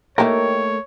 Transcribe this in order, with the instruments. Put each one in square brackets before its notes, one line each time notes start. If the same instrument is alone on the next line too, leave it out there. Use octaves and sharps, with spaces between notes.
[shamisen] D#3 E4 G4 [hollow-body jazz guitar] A3 A#3 A#4 [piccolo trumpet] C#5